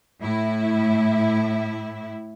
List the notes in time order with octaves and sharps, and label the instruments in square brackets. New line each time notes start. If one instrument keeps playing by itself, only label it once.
[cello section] A2 E4